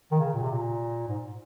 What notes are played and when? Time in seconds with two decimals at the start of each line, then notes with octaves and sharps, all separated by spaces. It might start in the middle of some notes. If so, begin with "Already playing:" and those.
0.12 D#3
0.19 C#3
0.34 A#2
0.43 C3
0.51 A#2
1.08 G#2